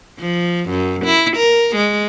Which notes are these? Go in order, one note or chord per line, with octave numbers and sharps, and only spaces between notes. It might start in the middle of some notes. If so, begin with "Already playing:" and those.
F3
F#2
E4
A#4
G#3